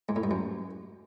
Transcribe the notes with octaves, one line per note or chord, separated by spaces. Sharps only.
G#2
A2
G2
F#2